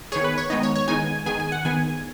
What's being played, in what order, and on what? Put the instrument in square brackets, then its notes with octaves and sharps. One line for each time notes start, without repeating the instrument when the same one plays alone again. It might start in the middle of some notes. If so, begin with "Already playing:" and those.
[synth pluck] D#3 B3 G#4 [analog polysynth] C#5
[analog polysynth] B4
C#5
[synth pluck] D#3 G#3 B3 D#4 [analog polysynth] D#5
[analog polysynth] C#5
C#5
[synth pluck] D#3 G#3 B3 D#4 [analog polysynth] G#5
[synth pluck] D#3 B3 G#4 [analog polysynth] G#5
[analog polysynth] G#5
F#5
[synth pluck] D#3 B3 G#4 [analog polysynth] G#5